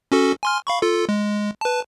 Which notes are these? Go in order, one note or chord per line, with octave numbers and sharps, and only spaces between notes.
C#4 F#4 A4
G#5 C6 F6
F5 B5 C#6
F4 A4
G#3
B4 A5